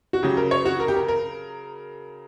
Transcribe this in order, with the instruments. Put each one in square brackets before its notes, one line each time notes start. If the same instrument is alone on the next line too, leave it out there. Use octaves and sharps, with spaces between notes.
[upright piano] F#4
C#3 F#3 G4
A#4
C#5
F#4
A#4
G4
A#4
A#4